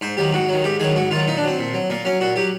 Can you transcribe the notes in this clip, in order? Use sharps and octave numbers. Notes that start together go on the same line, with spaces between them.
G#2 C5
D#3 F#3 G4
G#2 F#4
D#3 F#3
G#2 G4
D#3 F#3 G#4
G#2 F#4
D#3 F#3 F4
A#2 D#4
D4
F#3 C4
A#2
F#3
A#2 A#3
F#3 C#4
A#2 F#4
F#3 G4